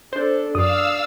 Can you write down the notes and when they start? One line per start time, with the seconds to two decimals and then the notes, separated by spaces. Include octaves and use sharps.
0.13 D4 A4 C5
0.55 F#2 D4 D5 F5 D#6 E6